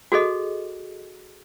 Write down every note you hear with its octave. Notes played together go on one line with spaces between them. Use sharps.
F#4 G#4 A4 D#5